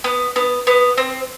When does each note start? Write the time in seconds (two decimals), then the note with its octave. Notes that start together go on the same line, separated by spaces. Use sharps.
0.04 B3
0.36 B3
0.67 B3
0.98 C4